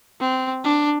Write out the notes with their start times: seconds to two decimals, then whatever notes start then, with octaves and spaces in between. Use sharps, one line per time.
0.21 C4
0.64 D4